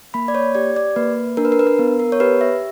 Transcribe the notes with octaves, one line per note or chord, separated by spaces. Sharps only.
A#3 B5
D5
C#5
G4 D5
D5
A#3 B4
D4 A#4
B4
A#4
B4
A#4
B3
A#4
C#5
G4 B4
E5